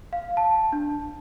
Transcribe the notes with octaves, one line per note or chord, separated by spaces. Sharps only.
F5
A5
D4